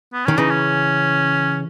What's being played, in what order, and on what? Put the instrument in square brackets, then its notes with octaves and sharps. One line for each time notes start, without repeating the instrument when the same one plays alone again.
[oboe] B3
[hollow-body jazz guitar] D#3 [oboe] C#4
[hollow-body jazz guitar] C#3 E3 [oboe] D#4
[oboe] C#4